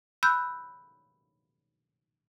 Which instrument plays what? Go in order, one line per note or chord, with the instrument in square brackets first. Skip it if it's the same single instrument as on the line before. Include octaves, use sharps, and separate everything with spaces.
[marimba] B5 E6 F#6 G6